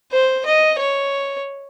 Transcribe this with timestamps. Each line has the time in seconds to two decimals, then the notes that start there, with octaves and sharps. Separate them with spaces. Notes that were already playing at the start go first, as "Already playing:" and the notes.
0.12 C5
0.46 D#5
0.79 C#5